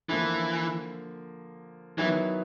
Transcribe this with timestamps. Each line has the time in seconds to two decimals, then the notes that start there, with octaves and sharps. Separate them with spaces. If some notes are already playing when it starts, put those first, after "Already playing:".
0.09 D3 E3 F3 A#3
1.98 D#3 E3 F#3 B3 E4